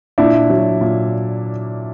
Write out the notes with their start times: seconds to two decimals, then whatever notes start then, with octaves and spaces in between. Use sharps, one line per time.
0.18 A#2 D4 E4
0.50 F#3
0.81 A#2